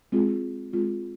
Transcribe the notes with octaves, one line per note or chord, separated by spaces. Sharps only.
G#3 C4 F4 G#4
G#3 C4 F4 G#4